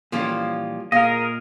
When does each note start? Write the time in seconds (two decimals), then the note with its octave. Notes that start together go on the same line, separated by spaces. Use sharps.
0.12 A#2 E3 F3 G3 A#3 C#4
0.92 A#2 G#4 A#4 D#5 F5